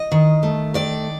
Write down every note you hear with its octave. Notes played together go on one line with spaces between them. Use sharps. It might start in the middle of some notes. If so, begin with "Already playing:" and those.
Already playing: D#5
D#3
A3
D#3 D5